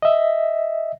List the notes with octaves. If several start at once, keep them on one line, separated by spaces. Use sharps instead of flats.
D#5 E5